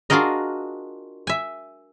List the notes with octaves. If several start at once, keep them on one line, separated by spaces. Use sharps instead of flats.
D4 F4 F#4 G#4 A#4 D#5
E5 G#5